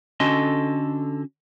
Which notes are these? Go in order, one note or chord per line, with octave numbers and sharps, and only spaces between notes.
D3 C#4 F#4 A4 D#5 C6